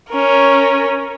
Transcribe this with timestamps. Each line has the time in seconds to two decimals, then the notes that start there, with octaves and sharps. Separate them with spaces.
0.12 C#4 A#4